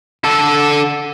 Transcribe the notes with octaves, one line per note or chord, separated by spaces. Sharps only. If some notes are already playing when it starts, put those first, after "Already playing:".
D3 A4